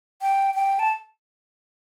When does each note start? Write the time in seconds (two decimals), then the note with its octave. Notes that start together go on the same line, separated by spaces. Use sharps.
0.22 G5
0.54 G5
0.79 A5